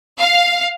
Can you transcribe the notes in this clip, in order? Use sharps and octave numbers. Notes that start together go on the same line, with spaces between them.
F5